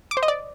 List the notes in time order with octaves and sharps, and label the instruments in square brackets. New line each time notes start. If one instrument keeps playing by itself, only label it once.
[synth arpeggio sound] D6
C5
D#5
D5